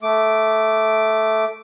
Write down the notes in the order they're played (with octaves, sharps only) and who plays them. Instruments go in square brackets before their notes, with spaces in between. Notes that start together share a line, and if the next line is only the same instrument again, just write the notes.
[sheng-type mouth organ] A3 D6